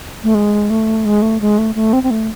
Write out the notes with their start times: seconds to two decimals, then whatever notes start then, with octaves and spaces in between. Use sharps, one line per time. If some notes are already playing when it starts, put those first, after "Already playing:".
0.24 A3
0.35 G#3
0.70 A3
1.05 G#3
1.22 A3
1.41 G#3
1.58 A3
1.75 A3
1.93 C4
2.03 C4
2.11 A3